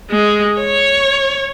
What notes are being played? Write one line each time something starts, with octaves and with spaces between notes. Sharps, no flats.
G#3
C#5